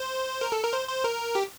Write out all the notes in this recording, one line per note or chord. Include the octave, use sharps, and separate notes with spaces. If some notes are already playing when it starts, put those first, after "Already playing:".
Already playing: C5
A#4
A4
A#4
C5
C5
A#4
G4